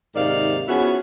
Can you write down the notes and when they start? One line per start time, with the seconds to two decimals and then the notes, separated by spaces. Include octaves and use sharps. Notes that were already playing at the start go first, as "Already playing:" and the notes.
0.15 D#2 G#2 C3 D#3 D5 F5
0.68 F3 B3 C#4 E4 F#4 G#4